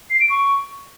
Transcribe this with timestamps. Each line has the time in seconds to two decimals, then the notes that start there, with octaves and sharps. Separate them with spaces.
0.10 C7
0.19 D7
0.29 C#6